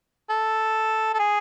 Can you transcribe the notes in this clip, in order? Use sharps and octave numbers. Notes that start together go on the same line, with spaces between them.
A4
A4
G#4